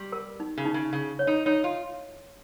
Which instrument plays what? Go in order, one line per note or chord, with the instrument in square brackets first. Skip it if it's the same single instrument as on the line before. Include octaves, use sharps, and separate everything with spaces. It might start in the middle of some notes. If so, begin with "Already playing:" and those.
Already playing: [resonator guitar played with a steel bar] G3 [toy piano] G4
[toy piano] A#4
D#4
[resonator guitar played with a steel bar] C#3
[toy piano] D#4
[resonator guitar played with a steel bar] C#3
[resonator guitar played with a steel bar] C#3 [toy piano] F5
[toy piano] C#5
[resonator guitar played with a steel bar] D#4
[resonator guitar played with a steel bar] D#4 [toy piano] C#5
[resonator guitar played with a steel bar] F4